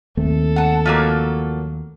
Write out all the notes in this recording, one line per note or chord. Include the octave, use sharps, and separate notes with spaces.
D#2 A3 C4 A4
F#5 A5
F3 F#3 A#3